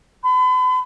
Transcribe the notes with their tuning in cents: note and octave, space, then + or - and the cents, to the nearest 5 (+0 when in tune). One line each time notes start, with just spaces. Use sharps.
B5 +40